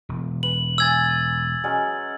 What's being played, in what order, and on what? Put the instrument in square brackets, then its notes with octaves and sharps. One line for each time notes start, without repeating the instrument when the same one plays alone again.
[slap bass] E1
[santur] B4 [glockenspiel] F#7
[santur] E5 G#5 D#6 [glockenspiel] E6 G#6 A6
[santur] F#3 G#3 C#4